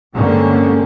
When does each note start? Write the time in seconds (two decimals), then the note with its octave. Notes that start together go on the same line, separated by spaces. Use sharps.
0.14 G2 D3 G#3 A#3 C4 C#4